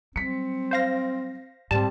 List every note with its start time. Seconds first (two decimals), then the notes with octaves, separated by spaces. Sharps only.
0.16 F#3 G3 C4 B6 C#7
0.71 C5 F5 A#6
1.71 G#2 G3 C4 A5